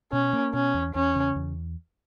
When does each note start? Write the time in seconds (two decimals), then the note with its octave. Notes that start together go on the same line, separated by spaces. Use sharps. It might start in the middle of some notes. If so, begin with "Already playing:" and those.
0.12 B2 C#4
0.33 A#3
0.54 B2 C#4
0.74 E2
0.95 E2 C#4
1.15 C#3
1.36 E2